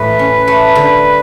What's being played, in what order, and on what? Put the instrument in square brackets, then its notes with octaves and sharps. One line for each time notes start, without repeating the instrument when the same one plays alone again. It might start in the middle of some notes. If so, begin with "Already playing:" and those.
Already playing: [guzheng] A2 E3 [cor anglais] B4
[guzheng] C#4
A3
D3